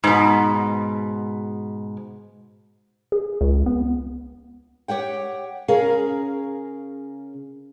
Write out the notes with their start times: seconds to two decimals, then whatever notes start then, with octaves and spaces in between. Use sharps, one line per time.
0.04 G#2 B2
3.12 G#4
3.41 C#2
3.66 B3
4.88 G4 C#5 F#5 G5
5.68 C#3 C#4 G#4 A#4 F5